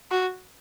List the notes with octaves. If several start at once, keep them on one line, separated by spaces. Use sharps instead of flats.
F#4